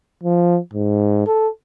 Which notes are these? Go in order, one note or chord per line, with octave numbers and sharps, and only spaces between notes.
F3
G#2
A4